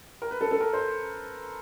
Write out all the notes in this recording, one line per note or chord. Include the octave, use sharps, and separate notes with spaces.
A#4
B4
A4
A4
A#4
C5